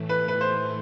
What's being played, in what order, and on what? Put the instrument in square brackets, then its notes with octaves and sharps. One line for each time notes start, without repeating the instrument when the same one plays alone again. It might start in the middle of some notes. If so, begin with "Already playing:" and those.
Already playing: [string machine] A2 E3 A3
[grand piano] B4
B4
C5